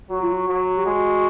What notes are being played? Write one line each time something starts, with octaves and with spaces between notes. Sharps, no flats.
F#3 F#4
F4
F#4
F#3
G4
G#3 F#4